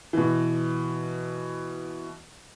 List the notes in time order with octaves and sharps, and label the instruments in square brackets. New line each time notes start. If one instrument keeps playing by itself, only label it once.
[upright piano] B2 E3